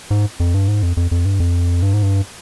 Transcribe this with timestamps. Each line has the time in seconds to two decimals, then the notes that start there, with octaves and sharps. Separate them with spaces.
0.11 G#2
0.40 F2
0.54 G2
0.68 G#2
0.83 F2
0.97 F2
1.11 F2
1.25 G2
1.40 F2
1.82 G2
1.93 G#2
2.03 G2